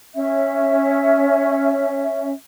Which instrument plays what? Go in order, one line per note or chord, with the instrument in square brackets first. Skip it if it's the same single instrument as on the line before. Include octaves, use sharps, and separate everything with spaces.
[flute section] C#4 E5